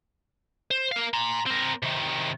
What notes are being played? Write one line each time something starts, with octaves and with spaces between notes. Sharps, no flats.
C5
A#4 F5
A#5 C6
C4 A#4
C3 D#3